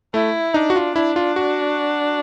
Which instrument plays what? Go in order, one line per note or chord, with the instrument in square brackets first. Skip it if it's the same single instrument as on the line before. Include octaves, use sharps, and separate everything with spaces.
[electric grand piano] A3 [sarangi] E4
[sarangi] D4 [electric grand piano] D#4
[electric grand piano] F#4
F4
[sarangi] D4 [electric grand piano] E4
[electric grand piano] F4
F#4